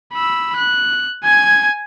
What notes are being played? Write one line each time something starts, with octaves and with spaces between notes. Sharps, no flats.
B5 E6
F#6
G#5 G#6